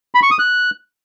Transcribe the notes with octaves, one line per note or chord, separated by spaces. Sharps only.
B5
C#6
D#6
F#6